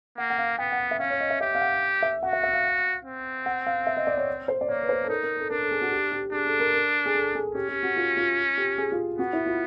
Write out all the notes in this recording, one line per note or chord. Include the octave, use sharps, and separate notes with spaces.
A#3 F#5
F#5
F5
B3 G5
F#5
E5
C#4 F5
C#5
D#5
E5
G4 E5
F5
F#5
E5
F#4 F#5
E5
E5
F5
C4
F#5
F5
E5
D#5
D5
C#5
C5
D5
A#3 C#5
B4
C5
A4
D#4 A#4
A#4
A4
D4 A#4
A4
G#4
F#4
G4
G4
D4 G#4
A4
A#4
A#4
G#4
A4
G#4
C#4 G4
G4
F#4
F4
F4
G4
G#4
F4
B3 F#4
E4
F4